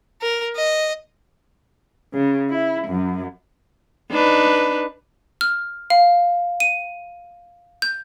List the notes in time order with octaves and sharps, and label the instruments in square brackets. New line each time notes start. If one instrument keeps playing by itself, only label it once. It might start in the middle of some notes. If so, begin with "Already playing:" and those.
[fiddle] A#4
D#5
[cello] C#3
E4
F#2
[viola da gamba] D4 D#4 B4
[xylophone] F6
F5
D#7
G6